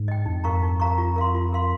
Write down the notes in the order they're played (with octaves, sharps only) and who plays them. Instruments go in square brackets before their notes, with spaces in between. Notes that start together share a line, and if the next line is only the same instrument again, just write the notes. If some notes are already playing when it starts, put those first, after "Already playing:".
Already playing: [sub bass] G#2
[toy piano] D#5 G5
[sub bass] F2 [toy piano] D#4
[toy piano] A#4 F5 A#5 C#6
D#4
A#4 F5 A#5 C#6
F4
A#4 F5 C6
F4
A#4 F5 C6